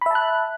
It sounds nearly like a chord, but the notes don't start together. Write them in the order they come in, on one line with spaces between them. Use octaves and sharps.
B5 E5 A5 F#6